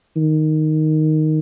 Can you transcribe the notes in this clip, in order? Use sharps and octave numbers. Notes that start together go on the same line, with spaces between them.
D#3